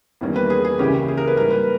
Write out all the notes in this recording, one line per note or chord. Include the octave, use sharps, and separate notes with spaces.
E2 D#3 G3 A#3 C#4
B4
G#4
G#4
C#2 C#3 E3 A#3 C#4 G4
G#4
A#4
B4
G#2 G3 A#3 A#4
B4